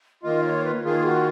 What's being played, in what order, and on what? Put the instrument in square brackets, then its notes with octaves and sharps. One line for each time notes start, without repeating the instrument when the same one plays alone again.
[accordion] D#3 A#3 F4 [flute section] D#5
[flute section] C#5
B4
[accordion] D#3 A#3 F4 [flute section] G#4
[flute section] F#4